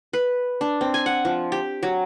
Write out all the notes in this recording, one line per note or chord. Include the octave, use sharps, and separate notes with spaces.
B4
D4
C4
G#5
F#5
F3
G4
F#3